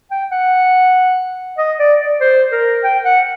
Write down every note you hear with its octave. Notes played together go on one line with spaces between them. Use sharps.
G5
F#5
D#5
D5
D5
C5
A#4
G5
F#5